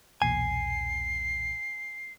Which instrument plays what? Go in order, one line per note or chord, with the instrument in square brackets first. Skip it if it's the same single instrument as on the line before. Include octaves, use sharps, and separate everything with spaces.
[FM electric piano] B1 E2 A#2 [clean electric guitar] G#5 [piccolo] C7